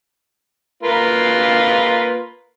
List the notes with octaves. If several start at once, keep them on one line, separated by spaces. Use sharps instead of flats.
A#3 F4 B4